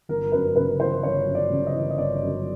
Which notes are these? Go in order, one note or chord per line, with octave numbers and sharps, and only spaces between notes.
G1 A#4
F#2 B4
C#3 B4
E3 C5
G1 C#5
F#2
D5
C#3
D#5
E3
D#5
G1 D5
F#2